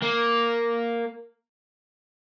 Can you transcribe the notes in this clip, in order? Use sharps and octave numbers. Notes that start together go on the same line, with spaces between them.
A#3